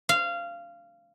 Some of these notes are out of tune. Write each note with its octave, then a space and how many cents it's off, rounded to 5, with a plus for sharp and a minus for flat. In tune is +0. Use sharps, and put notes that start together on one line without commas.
F5 -20